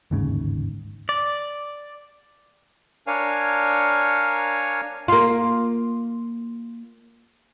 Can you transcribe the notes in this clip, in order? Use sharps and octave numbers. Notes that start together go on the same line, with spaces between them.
G1 D#2 G#2 C#3
D5
D4 A#4 C#5 F5 G#5
A#3 F4